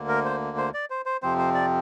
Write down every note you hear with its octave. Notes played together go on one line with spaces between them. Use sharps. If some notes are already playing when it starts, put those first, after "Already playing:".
Already playing: D2 D3 A#3
A#4
C5
C5
D5
C5
C5
F2 C3 F3 C4 C5
C5
D5